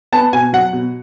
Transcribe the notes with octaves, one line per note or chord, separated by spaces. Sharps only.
B3 A5
B2 G#5
F#3 F#5
B2